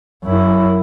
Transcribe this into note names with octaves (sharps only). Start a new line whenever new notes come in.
F#2 E4